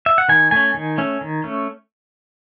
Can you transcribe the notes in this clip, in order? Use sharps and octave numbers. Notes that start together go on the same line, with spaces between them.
E5
F#5
D#3 G#5
A3 C#4 G#5
D#3
A3 C#4
D#3
A3 C#4